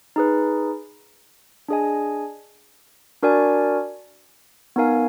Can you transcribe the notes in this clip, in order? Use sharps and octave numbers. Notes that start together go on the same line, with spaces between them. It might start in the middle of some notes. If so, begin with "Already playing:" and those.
D#4 G#4 B4
D4 G#4 D#5 G#5
D4 F#4 A#4 D5 G#5
B3 D#4 A#4 F5 G#5